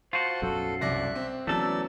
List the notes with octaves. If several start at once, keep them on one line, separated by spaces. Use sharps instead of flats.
F4 F#4 C5 A5
B1 F#2 F#3 A4
C2 D5 E5 F#6 A#6
C4
E3 F#3 A3 B3 C#4 A4 D5 E6